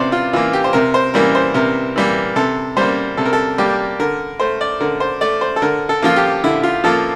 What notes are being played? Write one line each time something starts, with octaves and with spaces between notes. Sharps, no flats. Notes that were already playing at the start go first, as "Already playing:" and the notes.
Already playing: C3 E3 A#3 C5 D5
F4
E3 A#3 F4
G4
C5
C3 A#4
C5
E3 G3 A#3 A#4
C5
C3 A#4
E3 G3 A#3
C3 A4
G3 A#3 C5
C3 A4
A#4
A4
G3 A#3 G4
D3 A#4
A3 C5
D5
D3 A#4
C5
A3 D5
C5
A4
D3 A#4
A4
F3 A#3 F4
G4
D3 E4
F4
F3 A#3 A4